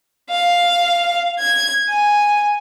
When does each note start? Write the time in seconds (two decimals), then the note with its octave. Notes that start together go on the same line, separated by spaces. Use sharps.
0.30 F5
1.39 G#6
1.89 G#5